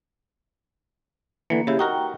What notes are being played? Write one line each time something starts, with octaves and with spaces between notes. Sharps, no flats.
D3 E3 A#3
C#3 E4 G4
D#4 F#4 A#4 G5